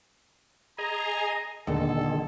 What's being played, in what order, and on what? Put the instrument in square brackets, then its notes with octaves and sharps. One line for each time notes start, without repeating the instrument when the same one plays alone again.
[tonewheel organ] G#4 D#5 G#5 [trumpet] A#5
[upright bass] D#1 [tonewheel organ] D3 D#3 G#3 [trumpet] A4